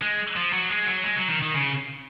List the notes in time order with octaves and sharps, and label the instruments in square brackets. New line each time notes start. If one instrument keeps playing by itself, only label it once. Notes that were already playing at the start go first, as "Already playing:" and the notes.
[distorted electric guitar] G#3
F3
F#3
G#3
F#3
G#3
F#3
D#3
D#3
C#3